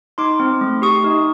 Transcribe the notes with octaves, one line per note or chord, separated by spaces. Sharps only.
D#4 C6 D6
C4
A3
G4 C#6 D#6
D#4